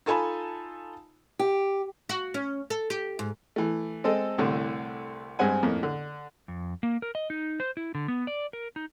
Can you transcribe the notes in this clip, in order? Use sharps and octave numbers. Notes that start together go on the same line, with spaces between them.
D#4 F4 A4 G#5 A5 B5
G4
F#4
C#4
A4
G4
G#2
E3 A3
G#3 C4 A4 D#5
C2 A2 D3
G2 G#3 C4 F#5 G#5
F2 A2 A#3
D3
F2
A#3
A#4
D#5
D#4
C5
E4
D3
B3
D5
A#4
D#4